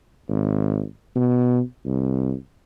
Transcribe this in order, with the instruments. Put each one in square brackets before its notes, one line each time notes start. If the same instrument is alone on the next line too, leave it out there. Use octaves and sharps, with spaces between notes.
[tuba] G#1
B2
C2